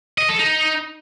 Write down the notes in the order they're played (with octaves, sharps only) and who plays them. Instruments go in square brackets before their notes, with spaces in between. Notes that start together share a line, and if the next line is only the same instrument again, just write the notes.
[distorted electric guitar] D#5
A4
D#4